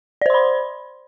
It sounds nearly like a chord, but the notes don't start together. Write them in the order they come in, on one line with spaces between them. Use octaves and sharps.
D5 C5 C6 B5